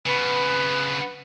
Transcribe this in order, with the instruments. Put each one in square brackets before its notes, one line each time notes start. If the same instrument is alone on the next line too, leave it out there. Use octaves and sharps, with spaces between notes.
[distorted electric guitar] C#3 B3 [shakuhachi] B4